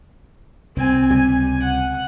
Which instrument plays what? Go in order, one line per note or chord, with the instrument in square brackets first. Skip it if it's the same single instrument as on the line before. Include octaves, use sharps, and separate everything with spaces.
[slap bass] C2 [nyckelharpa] C4 G#5
[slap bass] C#2 C3 G3 [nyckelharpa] G#5
[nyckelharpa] F#5